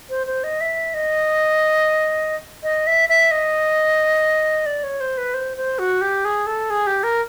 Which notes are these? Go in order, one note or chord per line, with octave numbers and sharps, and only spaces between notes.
C5
C5
D#5
E5
D#5
D#5
E5
E5
D#5
D5
C#5
C5
B4
C5
C5
F#4
G4
G#4
A4
G#4
G4
A#4